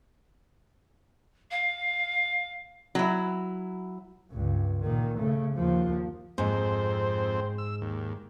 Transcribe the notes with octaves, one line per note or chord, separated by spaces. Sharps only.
F5
F#3 E4
C#2 G2
A#2 D#3
C#3 A3
D#2 F3
F2 G#2 C4 C5
E6
D#2